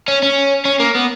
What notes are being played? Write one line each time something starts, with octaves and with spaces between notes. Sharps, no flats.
C#4
C#4
C#4
A#3
B3